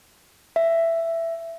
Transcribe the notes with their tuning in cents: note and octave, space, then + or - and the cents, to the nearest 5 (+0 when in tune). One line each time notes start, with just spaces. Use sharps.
E5 +10